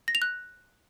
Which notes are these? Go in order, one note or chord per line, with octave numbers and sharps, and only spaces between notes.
A#6
F7
F#6